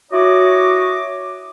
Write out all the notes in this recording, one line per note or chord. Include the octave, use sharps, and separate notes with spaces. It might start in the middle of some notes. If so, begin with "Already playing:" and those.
E4 F#4 C#5 D#5 D6